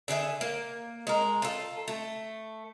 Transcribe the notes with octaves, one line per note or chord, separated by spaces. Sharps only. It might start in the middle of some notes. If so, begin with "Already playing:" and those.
D3 G#4 B4 E5
A#3
G#3 A#4
F4 A4
A3